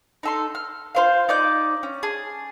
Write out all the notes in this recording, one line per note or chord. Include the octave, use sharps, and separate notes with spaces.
D#4 A4 C6
F6
F4 C5 F5
D#4 D5 D6 G6
C#4
G#4 A5